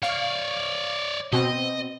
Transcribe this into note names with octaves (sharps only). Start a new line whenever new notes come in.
C#5 D5 F5 C#6
B2 C4 D#5